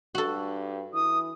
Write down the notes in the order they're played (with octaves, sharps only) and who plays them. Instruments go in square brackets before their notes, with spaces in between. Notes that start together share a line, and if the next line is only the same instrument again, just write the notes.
[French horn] G2 [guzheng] F#4 A4
[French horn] E3 [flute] D#6